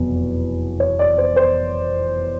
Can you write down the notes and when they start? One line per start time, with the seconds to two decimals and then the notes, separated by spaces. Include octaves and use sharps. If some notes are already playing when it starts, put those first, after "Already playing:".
Already playing: F1 E2 B2 F#3
0.80 C#5
0.99 D5
1.18 C5
1.36 C5